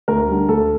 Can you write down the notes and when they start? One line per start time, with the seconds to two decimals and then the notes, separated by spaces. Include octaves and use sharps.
0.08 D2 A#4
0.28 D3 G3
0.49 D2 A4